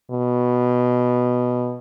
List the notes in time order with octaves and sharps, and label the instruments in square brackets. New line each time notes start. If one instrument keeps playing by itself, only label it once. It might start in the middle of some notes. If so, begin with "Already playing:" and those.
[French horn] B2